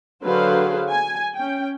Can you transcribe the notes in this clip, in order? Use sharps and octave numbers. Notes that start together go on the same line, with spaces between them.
D3 F#3 G#4 B4 C5 F5
G#5
C#4 G5